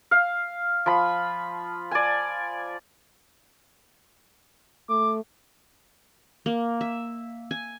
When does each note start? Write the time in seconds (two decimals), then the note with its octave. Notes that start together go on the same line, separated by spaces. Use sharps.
0.11 F5
0.86 F3 B5
1.91 D5 G#5
4.89 A3 D6
6.46 A#3
6.81 E5
7.51 G#5